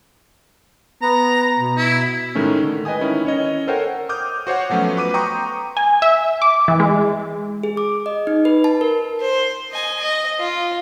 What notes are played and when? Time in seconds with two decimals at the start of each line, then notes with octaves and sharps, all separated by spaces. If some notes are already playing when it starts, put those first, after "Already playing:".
1.02 B3 A#5
1.59 B2
1.77 E4
2.35 A2 D#3 G#3 A3 C#4
2.63 D3
2.85 B4 D#5 G5 G#5 D#6
3.01 D#3 C#4 E4
3.25 C#4 C#5 D#5
3.67 A4 A#4 C5 C#5 F#5 G5
4.09 D6 D#6 F6 G6
4.47 F#4 C5 C#5 F#5
4.70 F3 F#3 A3 B3 C#4
4.97 B4 D6 D#7
5.14 G5 A#5 C6 C#6 D#6 G6
5.77 G#5
6.02 E5
6.42 D6
6.68 E3
6.80 G#3
7.63 G#4
7.77 D6
8.06 D#5
8.27 D#4
8.45 B4
8.64 A5
8.81 A#4
9.21 C5
9.71 D#5 G#5
9.99 D#5
10.39 F4